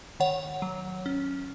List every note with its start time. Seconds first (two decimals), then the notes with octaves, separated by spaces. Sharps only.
0.20 D#3 C#5 F#5
0.62 F#3
1.06 C#4